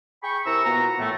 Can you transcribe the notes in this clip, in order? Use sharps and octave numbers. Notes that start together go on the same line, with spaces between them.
G#4 G5 B5 C#6
C3 E4 A#4 A#5 C#6 E6
A#2 B3 F#4 B4 A#5
A2 E3 A3